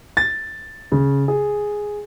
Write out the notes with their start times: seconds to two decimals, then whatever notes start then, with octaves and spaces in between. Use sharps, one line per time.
0.17 A6
0.92 C#3
1.28 G#4